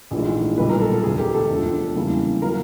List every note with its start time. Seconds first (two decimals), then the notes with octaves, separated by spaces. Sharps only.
0.11 A#1 G#2 E3 A3
0.57 B1 A#2 G3 B4
0.69 A#4
0.80 A4
0.92 A4
1.03 E1 D2 C3 G#4
1.18 G4
1.34 A4
1.50 E1 D2 D3 F3
1.96 E2 C#3 E3 G3 A#3
2.42 C#3 F#3 A#3 A#4